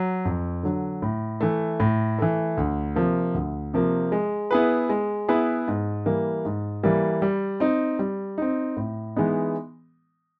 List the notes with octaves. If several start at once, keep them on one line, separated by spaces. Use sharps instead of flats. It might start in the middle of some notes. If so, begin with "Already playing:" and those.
Already playing: F#3
F2
D3 F#3
A2
E3 A3
A2
E3 A3
D2
C3 F3 A#3
D2
C3 F3 A#3
G#3
B3 E4 G#4 B4
G#3
B3 E4 G#4 B4
G#2
E3 G3 A#3
G#2
E3 G3 A#3
G3
C4 D#4
G3
C4 D#4
A2
E3 G#3 B3 D#4